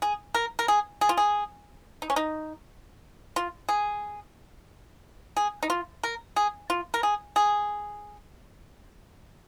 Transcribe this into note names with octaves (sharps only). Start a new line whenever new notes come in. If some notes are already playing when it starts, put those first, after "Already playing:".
G#4
A#4
A#4
G#4
G#4
F4
G#4
D#4
C#4
D#4
F4
G#4
G#4
D#4
F4
A#4
G#4
F4
A#4
G#4
G#4